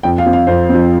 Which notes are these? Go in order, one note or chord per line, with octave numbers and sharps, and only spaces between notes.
F2 G5
F5
F3 C4
F5
F2 C5
F3 C4